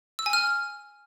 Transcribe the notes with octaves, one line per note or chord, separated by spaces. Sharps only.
E6
G#5
F6